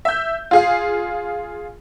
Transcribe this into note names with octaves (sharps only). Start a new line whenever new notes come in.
E5 G6
F4 G#4 F5